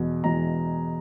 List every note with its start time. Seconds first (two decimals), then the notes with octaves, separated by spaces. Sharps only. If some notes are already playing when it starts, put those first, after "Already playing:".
Already playing: E2 B2 G#3
0.24 E2 B2 G#3 A#5